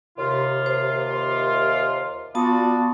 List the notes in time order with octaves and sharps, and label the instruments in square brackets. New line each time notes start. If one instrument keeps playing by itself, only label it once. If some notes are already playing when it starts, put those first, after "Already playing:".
[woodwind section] D#2 C3 F4
[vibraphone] C5
[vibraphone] B3 A5 D#6 [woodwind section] F4 F#4 D5